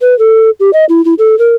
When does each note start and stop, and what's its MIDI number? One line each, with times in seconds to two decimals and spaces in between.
0.01 0.17 71
0.19 0.50 69
0.60 0.70 67
0.73 0.85 75
0.89 1.04 64
1.05 1.14 64
1.19 1.37 69
1.39 1.55 70